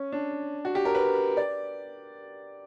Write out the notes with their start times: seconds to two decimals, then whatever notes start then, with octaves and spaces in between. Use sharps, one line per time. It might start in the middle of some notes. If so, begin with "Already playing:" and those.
Already playing: C#4
0.12 D4
0.65 F#4
0.75 G4
0.85 A#4
0.95 B4
1.37 D5